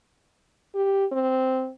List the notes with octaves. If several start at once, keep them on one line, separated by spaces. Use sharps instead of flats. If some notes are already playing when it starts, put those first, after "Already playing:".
G4
C4